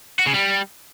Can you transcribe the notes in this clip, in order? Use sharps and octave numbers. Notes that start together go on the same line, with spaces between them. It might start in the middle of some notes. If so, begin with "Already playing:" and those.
F#4
C#3
G3